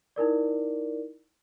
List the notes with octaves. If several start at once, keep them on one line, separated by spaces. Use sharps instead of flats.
D#4 E4 A#4 D5